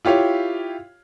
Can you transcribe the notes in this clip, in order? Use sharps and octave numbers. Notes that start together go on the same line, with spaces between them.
E4 F4 G4 C#5 F5